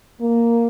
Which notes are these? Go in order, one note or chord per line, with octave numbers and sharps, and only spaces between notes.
A#3